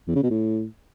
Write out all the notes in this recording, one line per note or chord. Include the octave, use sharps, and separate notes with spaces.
E2
C#3
B2
A2